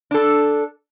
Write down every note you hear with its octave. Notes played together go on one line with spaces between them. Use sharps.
D4 A4